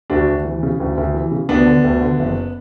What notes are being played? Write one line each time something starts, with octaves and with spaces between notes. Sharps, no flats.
D2 D4 F#4
D2
E3
C#3
D2
D2
E3
C#3
D2 B3 D4
D3
D2
D3
F#1